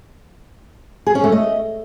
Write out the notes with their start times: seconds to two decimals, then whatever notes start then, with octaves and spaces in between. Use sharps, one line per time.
1.06 G#4
1.15 C#4
1.24 A3
1.32 D#5